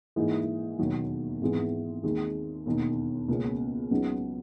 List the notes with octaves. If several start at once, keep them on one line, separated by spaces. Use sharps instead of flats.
G#2 E3 A#3 D#4 G#4
E1 D#2 D#3 F#3
G#1 G#2 E3 G#3 B3
D#2 D#3 G#3
E1 D#2 D#3
C#2 B2 A#3 C#4
C#2 C#3 F#3 B3 D#4